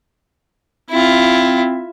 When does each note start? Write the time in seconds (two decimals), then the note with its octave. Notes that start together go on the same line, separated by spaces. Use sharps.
0.90 C4 E4 F4